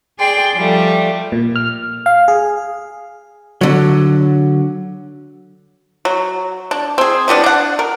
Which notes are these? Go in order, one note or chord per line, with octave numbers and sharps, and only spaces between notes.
G#4 D5 G5 C6
F3 G3 A3
A#2
F6
F5
G#4
D3 F#3
F#3
D4
C4 G#4
E3 G3 B3 D4
D4 F#5
A#4